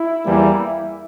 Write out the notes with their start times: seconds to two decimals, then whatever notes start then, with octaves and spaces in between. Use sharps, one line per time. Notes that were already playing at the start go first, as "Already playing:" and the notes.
Already playing: E4
0.25 E2 E3 G3 A#3